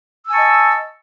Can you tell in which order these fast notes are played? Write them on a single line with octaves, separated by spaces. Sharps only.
E6 G#5 C#6 A5 D#5